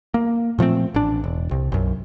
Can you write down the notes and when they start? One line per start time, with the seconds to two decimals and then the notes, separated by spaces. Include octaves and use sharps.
0.14 A#3
0.59 A#2 F3 A3 C4
0.94 A1 D4
1.24 E1
1.51 C2
1.72 B1 F#2